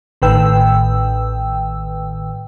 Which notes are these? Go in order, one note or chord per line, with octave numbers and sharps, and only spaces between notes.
A1 A2 D#3 B4 G5 E6